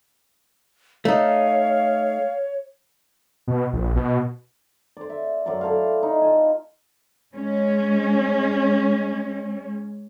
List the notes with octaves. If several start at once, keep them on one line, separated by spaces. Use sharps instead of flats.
A3 D#4 C#5 F5
B2
A#1
B2
C5 D5
E5
F#2 F#3 D5 C6
E4 A4 C5 F5
D#4
F4 G#5
G#3 C#4